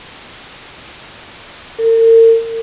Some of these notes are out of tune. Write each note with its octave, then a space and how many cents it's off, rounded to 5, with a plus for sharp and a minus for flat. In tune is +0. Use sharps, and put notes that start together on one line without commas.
A#4 -45